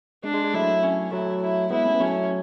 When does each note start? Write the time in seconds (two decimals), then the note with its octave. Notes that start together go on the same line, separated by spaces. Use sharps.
0.24 G#3 D4
0.34 G#3
0.44 G#3
0.54 F#3 A3 E4
0.83 C#4
1.12 F#3 A3 E4
1.41 E4
1.71 G#3 B3 E4
1.86 A3 C#4
1.95 B3
2.00 F#3 A3 C#4